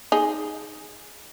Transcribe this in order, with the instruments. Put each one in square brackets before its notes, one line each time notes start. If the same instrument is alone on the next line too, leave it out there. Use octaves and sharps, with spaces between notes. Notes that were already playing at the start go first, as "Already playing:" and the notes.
[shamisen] D#4 G#4